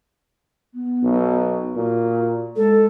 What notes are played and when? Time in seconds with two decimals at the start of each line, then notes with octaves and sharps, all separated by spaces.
0.74 B3
1.03 B1
1.76 A#2 F#4
2.56 G#3 A4